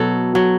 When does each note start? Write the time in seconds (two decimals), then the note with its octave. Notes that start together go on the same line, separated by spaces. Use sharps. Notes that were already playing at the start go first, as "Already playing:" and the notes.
Already playing: B2 F#3 A4
0.35 F#3